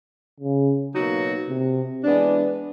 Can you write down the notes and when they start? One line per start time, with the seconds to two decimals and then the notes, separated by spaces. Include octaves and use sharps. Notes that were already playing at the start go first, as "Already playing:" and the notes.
0.40 C#3
0.95 B2 F#3 A#3 D#4 F#4
1.49 C3
2.04 E3 G#3 B3 D4